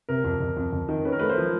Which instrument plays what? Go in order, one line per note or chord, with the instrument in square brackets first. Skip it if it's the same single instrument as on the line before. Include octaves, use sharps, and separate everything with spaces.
[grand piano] C3 [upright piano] A#4
[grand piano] F2
F2
F2
F2
D#3
[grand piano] C#4 [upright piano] B4
[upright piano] A#4
[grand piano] A3 [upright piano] B4
[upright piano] C5
[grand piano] F3